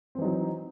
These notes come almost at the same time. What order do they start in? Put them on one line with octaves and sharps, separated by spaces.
C4 E3 D#4 F#3